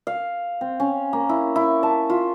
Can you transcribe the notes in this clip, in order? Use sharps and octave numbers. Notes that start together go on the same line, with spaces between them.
F5
C4
C#4
A#3
E4
E4
A5
F4